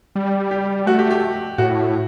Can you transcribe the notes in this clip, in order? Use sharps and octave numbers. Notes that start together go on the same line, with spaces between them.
G3
G4
A3 F#4
G4
G4
A2 F#4